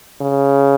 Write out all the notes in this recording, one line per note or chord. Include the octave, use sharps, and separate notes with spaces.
C#3